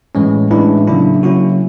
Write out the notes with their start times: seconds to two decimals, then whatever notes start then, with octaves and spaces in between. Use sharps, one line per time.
0.15 A2 E3 G#3 C#4
0.50 A2 E3 G#3 C#4 D4 E4
0.87 C#3 F#3 A#3 C#4 D4 E4
1.23 C#3 F#3 A#3 C#4 E4 F#4